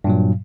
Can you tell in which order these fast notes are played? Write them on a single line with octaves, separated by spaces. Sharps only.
G2 A#2 F#3